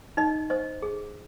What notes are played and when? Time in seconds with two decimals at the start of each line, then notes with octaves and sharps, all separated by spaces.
0.17 D#4 D#5
0.50 C5 D#5
0.82 G#4